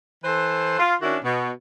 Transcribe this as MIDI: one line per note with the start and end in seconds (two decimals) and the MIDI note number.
0.24 0.78 52
0.24 0.78 69
0.24 0.78 71
0.24 0.78 72
0.79 0.94 65
1.02 1.17 51
1.02 1.17 61
1.02 1.17 62
1.02 1.17 64
1.02 1.17 66
1.23 1.51 47